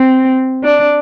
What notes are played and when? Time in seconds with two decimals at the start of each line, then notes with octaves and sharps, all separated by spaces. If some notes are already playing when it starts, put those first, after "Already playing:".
Already playing: C4
0.64 D4